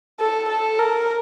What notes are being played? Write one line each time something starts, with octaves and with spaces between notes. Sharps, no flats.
A4
A4
A#4